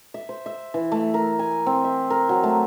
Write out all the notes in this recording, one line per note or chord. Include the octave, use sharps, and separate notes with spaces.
E5
C5
E5
E3
A3
A#4
G#5
C4
E5
A#4
F#3
A3